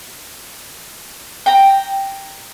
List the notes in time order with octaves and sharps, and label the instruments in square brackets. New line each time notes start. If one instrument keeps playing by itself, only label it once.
[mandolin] G5 A#5